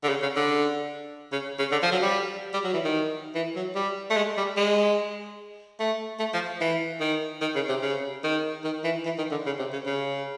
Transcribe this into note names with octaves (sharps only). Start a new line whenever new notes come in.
D3
C#3
C#3
D3
C#3
C#3
D3
F3
F#3
G3
G3
F#3
E3
D#3
E3
F#3
G3
A3
G#3
G3
G#3
A3
A3
F3
E3
D#3
D#3
C#3
C3
C#3
D#3
D#3
E3
E3
D#3
D3
C#3
C3
C#3
C#3